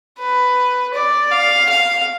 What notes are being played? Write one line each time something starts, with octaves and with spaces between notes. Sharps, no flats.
B4
D5
F5
F5